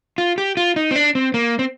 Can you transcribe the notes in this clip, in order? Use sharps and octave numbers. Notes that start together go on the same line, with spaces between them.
F4
G4
F4
D#4
C4
D4
C4
A#3
C4